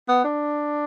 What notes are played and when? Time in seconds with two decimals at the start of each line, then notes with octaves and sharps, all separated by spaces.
0.08 B3
0.24 D4